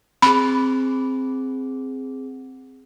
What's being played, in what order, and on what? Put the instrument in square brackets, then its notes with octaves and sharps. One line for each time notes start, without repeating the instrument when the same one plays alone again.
[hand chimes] C4 G#4 [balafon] B5